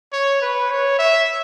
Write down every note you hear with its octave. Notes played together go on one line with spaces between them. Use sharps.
C#5
B4
C#5
E5